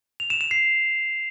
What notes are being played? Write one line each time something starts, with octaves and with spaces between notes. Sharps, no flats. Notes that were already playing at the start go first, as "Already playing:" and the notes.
F7
E7
E7
C7